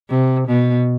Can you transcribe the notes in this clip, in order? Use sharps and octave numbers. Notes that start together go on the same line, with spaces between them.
C3
B2